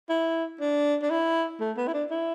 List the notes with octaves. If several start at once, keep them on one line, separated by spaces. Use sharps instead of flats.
E4
D4
D4
E4
A3
B3
E4
D4
E4